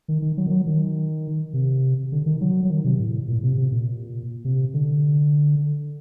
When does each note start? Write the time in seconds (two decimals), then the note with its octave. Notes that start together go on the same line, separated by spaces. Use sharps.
0.08 D#3
0.22 D#3
0.37 F#3
0.46 D#3
0.51 F#3
0.66 D#3
1.53 C3
2.12 D3
2.26 D#3
2.41 F#3
2.65 F#3
2.70 D#3
2.84 C3
2.99 A2
3.28 A#2
3.43 C3
3.57 C3
3.72 A#2
4.45 C3
4.74 D3